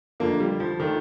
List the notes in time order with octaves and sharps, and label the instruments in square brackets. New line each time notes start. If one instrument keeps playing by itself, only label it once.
[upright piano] F2 D3 A3 D4 F4 [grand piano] A#3
[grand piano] G3
F3
[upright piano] D3 A3 D4 F4 [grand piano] D#3